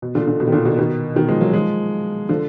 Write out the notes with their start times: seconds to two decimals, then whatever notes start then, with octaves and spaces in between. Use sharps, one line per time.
0.02 B2
0.15 A#2 D3
0.27 A#2 D3
0.40 B2
0.47 D#3
0.52 A#2 D3
0.65 B2 D#3
0.78 B2 D#3
1.16 B2 D#3
1.28 F3 G#3
1.41 F#3 A#3
1.54 F3 G#3
2.29 D3 F3